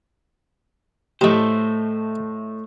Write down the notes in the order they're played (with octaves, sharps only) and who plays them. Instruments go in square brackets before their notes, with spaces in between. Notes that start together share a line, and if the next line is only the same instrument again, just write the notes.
[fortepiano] A2 D#5 [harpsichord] E3 G4 [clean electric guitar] A3 C5